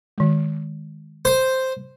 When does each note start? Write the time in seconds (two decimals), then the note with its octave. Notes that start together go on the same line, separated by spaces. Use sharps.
0.18 D#3 G#3
1.25 C5